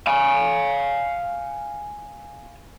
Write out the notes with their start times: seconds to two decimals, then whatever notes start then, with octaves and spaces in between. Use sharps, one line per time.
0.07 F5 G#5